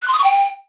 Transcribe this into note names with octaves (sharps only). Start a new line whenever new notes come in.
F#6
C6
D#6
C#6
G5